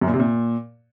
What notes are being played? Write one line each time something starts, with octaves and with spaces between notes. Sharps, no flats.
F#2
A#2
C3
A#2